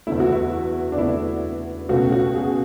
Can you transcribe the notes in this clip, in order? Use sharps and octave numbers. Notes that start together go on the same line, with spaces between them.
E2 D3 A3 E4
F#4
E4
D4
E2 D3 A3 E4
C#2 B2 A3 F#4
F#4
G#4